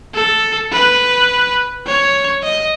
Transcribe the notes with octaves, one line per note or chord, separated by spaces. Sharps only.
A4
B4
C#5
D#5